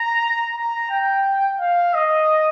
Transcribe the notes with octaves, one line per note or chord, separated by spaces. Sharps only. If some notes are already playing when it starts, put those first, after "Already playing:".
Already playing: A#5
A#5
G5
F5
D#5